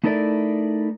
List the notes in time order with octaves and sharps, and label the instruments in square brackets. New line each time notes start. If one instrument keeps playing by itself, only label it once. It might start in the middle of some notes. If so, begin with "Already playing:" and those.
[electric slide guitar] A3 D#4 E4 A4 A#4 D5